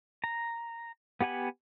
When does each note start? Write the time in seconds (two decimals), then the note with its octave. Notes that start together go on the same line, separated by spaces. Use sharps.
0.24 A#5
1.21 B3 G4 F#5 G#5 B5